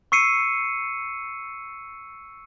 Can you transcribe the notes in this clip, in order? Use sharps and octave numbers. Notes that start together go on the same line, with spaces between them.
C#6 E6 C7 C#7 D#7